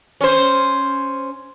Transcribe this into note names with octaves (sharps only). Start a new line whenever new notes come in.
C#4 C5